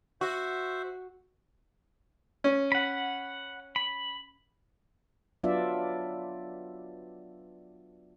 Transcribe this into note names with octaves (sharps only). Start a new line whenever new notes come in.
F#4 C5 E5
C#4
F#5 B5
B5
F#3 B3 D4 F4 D5 E5